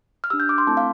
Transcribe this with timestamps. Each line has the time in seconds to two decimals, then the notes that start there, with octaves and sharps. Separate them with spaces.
0.24 F6
0.30 D4 G4 E6
0.40 G6
0.49 D6
0.58 C6
0.67 A3 C4 E4 A4 A5
0.77 F5